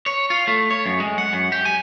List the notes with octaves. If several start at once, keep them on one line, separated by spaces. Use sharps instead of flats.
C#5
F4
A3
C#5
F#2
G#3
F#5
F#2
G4
G#5